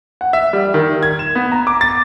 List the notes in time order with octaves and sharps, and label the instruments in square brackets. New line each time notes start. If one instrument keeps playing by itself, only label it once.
[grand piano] F#5
E5
G3
D#3
G#6
E7
B3
A#5
D6
A6